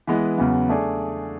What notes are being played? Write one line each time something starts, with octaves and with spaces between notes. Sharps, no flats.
E3 G#3 B3
E2 C#3 F#3 B3
A3 D4 G#4 D5